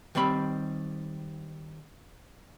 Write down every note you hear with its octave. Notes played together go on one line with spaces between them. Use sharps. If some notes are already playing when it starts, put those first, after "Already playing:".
D#3 G3 C4 B5